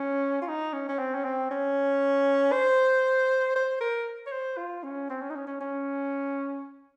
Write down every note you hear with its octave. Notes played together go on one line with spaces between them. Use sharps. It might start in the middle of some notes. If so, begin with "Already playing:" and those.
Already playing: C#4
F4
D#4
C#4
C#4
C4
C#4
C4
C#4
C5
C5
A#4
C#5
C5
F4
C#4
C4
C#4
D#4
C#4
C#4
C#4